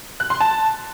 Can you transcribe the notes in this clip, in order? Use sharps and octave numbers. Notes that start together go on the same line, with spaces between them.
F#6
C6
A5